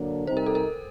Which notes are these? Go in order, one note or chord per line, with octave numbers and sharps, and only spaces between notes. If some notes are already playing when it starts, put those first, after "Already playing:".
Already playing: D3 F#3 A#3 D4
C3 G3 C4 D#4 C5
A#4
A4
A#4